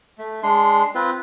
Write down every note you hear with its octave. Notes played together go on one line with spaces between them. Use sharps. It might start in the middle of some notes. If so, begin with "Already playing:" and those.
A3
G#3 D4 C6
C4 F4 B4